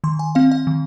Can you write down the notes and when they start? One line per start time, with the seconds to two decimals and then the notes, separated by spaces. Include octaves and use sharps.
0.04 D#3 C6
0.19 G#5
0.35 C4 F5
0.52 F5
0.67 D#3